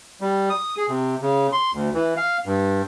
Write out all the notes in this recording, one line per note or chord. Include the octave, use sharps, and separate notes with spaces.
G3
D#6
G#4
C3
C#3
C6
D2
E3
F5
G2